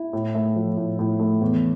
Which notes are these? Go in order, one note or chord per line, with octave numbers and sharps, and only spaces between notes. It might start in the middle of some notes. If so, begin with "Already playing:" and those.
Already playing: E4
A2
A3
F3
A2
A2
A3
E2